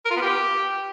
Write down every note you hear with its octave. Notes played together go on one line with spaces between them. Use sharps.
A#4
F4
B3
G4